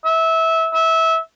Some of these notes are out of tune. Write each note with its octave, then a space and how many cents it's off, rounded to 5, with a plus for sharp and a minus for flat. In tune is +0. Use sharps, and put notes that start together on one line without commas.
E5 -20
E5 -20